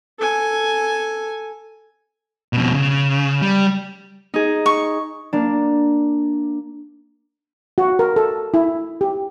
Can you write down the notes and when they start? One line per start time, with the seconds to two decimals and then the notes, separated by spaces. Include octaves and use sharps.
0.19 A4 G#5
2.53 F2 B2
2.74 C#3
3.42 G3
4.34 D#4 G#4
4.66 C#6
5.33 A#3 D4
7.78 F#4
7.99 A#4
8.16 A4
8.54 E4
9.01 G4